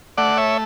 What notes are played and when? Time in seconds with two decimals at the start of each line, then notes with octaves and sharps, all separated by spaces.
0.17 A3 D5 F#5
0.37 C#5 E5